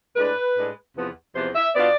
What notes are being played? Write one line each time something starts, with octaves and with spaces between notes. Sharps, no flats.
A2 G#3 D4 B4
A2 G#3 D4
E2 C3 F3 B3
E2 C3 F3 B3 C5
E5
B2 B3 D4 F4 D5